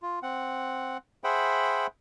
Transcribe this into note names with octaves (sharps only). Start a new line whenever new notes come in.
F4
C4 F#5
G#4 C5 E5 F#5 G5 B5